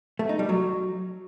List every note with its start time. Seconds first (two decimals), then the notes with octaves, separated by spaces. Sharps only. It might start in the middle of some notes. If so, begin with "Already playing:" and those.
0.19 A3
0.29 D#4
0.39 G3
0.49 F#3